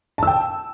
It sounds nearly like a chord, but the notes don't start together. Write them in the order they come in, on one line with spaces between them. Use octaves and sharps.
A5 E6 G5